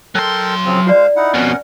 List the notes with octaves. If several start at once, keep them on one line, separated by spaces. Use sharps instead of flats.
F#3 A4 A#4 G5 C6
C#3 F3 C4
G#3 F4 C5 D5 F5
D#4 E4 F#5
F2 B2 C#4 A#4 F#5